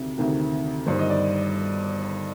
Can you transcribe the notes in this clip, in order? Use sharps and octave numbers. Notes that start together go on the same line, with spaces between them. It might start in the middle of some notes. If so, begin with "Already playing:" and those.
Already playing: D2 C3 D#3
D2 C3 D#3
G1 G2 D#3 C5
D#5
D5